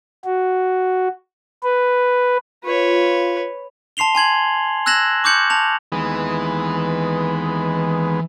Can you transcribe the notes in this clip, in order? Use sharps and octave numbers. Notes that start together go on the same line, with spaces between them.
F#4
B4
F4 B4 C#5
A5 C6 C7 F7 G7
G#5 C6 G#6 F#7
E6 F#6 G#6 A#6 E7 F#7
C#6 D6 F#6 G6 C#7 F#7
A5 F7
D#2 E3 G#3 B3